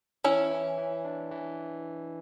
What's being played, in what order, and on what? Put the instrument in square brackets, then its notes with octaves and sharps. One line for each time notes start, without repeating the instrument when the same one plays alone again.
[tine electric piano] E3 [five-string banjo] C#4 E4
[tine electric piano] E3
E3
D4
E3